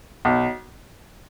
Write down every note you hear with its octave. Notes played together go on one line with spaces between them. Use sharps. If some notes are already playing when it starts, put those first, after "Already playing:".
B1